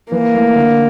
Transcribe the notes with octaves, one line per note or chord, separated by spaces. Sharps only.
E3 A#3
A3 E4
D3